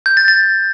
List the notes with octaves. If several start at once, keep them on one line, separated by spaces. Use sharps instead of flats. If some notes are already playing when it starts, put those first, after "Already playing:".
G6
A6
A6